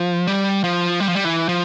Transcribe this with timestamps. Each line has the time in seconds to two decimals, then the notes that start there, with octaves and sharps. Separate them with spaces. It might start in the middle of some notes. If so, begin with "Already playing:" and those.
Already playing: F3
0.27 G3
0.64 F3
1.00 G3
1.08 F3
1.15 G3
1.24 E3
1.49 F3